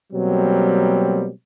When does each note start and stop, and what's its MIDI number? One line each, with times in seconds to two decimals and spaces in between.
0.13 1.29 47
0.13 1.29 54
0.13 1.29 55
0.13 1.29 58
0.13 1.29 60